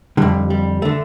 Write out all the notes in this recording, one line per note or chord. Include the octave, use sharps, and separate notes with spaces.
F2 D3 G3
G3
D3 A3